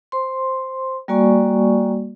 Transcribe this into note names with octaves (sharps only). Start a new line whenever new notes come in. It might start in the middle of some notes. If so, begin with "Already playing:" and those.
C5 C6
G3 A#3 F#4 D5 G#5 C#6